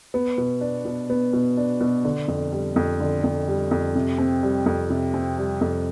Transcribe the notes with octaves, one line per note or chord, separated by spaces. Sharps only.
B3
B2
D4
B2
B3
B2
D4
B2
D3
F2
G3
F2
D3
F2
G3
F2
C3
C4
G3
F2
C3
C4
G3
F2